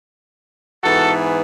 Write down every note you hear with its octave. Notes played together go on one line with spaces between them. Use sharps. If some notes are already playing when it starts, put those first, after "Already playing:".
G#2 E3 B3 F#4 A4